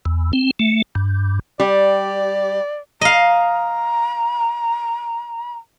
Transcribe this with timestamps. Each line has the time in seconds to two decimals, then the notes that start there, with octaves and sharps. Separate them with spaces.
0.05 E2
0.33 C4
0.60 A3
0.95 G2
1.60 G3 G4 D5
3.01 D#5 F5 A#5